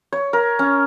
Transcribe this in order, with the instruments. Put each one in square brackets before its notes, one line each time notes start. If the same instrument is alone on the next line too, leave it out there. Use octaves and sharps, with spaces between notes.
[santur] C#5
A#4
C#4